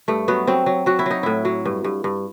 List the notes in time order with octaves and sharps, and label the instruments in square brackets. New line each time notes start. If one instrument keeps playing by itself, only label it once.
[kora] G2 A3
F#3 B3
F#3 C4
F#3
F#3 F#4
E4
F#3 D#4
A2 E4
F#3
G2
G2
G2